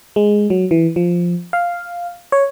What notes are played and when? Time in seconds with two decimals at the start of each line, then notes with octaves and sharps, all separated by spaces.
0.16 G#3
0.50 F#3
0.71 E3
0.96 F3
1.53 F5
2.32 C#5